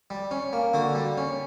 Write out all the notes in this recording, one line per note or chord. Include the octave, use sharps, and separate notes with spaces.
G3
C#4
A#3
D3 F#4
G3
C#4